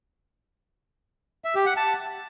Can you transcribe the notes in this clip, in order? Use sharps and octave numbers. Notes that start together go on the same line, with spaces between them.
E5
G4
F#5
A5